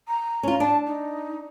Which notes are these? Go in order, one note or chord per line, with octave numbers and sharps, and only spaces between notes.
A#5
C#4 F4
D4 A5
D#4